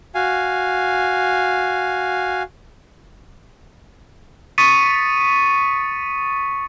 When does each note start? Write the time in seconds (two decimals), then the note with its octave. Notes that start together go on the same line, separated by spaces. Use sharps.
0.15 F#4 F5 G#5
4.58 C#6 D#6 A6 B6 C#7 D#7